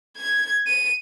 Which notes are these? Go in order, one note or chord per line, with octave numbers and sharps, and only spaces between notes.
G#6
D#7